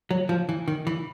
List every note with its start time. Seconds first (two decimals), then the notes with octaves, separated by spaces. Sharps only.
0.11 F#3
0.29 F3
0.49 E3
0.68 D#3
0.87 E3